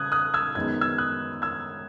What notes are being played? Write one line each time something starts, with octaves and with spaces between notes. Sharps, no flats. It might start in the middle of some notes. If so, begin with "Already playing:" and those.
Already playing: C#3 D#6 F#6 G#6
D#6 F#6
E6 G#6
F#2 D#3 G#3 B3 G#6
E6 G#6
D#6 F#6
E6 G#6